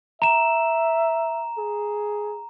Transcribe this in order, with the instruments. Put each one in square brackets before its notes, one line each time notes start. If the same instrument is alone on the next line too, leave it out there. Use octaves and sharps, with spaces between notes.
[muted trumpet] E5 [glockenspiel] A#5 E7
[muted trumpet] G#4